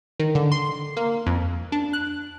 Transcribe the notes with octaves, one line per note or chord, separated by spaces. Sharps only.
D#3
D3
C6
A#3
F2
D4
F#6